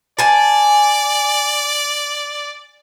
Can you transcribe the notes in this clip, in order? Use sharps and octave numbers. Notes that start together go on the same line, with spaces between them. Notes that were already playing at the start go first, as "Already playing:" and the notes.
D5 G#5 A5